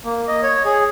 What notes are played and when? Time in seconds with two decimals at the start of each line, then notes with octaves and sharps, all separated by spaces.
0.04 A#3
0.28 D#5
0.43 C#5
0.65 G#4